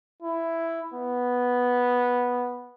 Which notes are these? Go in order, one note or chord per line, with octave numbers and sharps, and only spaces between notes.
E4
B3